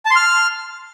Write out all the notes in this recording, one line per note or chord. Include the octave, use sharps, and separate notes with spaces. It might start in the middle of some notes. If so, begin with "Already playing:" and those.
A5
C6
F6